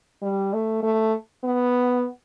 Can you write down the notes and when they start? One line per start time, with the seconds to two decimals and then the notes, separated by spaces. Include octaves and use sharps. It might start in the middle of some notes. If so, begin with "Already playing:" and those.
0.22 G3
0.53 A3
0.83 A3
1.44 B3